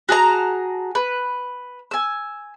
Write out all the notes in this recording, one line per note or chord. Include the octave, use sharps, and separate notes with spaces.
F#4 G#4 A5 A#5
B4
G#5 E6